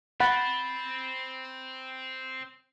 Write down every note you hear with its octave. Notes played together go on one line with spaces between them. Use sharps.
C4 F#5 B5 A6